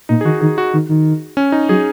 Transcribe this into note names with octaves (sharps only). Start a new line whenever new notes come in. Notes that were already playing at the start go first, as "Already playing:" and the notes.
A#2 D#4
G#4
D#3 F#4
D#3 G#4
F#4
D#3
D#3
C#4
D#4
F#3 G#4